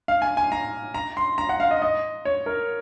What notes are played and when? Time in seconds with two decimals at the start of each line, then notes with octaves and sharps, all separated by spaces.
0.08 F5
0.22 G#5
0.37 G#5
0.52 A#5
0.94 A#5
1.17 C6
1.38 A#5
1.49 F#5
1.60 F5
1.71 D#5
1.82 D#5
2.25 C#5
2.46 A#4